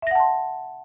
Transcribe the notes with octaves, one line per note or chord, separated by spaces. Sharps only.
E5 F#5 A5 C6 A#6